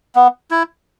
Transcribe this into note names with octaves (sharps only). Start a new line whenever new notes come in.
B3
E4